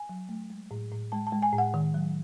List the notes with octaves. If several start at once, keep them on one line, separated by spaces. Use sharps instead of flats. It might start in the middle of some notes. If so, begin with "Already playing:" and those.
Already playing: G#5
F#3
A3
G#3
A2
A2
G#3 A5
A5
G#3
G#5
A2
F#5
D#3
F#3